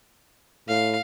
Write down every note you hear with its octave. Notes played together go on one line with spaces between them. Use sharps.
A2 F5